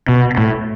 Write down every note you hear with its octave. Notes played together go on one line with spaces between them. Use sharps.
B2
A2